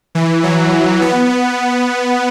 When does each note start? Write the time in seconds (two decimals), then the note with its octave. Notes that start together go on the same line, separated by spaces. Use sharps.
0.15 E3
0.43 F#3
1.01 B3